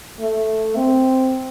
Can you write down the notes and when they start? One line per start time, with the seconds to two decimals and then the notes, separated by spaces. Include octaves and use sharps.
0.20 A3
0.76 C4